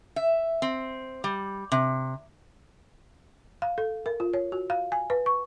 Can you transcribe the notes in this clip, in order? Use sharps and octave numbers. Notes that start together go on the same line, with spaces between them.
E5
C4
G3
C3
F5
A4
A#4
F4
C#5
F#4
F5
G#5
B4
C#6